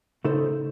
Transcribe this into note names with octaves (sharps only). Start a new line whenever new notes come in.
C#3 A3 D#4 A4 C5